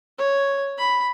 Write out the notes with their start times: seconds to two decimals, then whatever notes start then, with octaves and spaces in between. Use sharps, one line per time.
0.19 C#5
0.78 B5